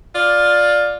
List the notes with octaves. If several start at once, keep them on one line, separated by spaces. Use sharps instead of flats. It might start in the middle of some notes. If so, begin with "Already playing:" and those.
F4 D5